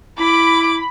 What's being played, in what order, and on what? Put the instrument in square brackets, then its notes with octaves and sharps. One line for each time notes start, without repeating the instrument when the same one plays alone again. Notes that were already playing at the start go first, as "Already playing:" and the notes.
[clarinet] E4 [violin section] B5 [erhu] D6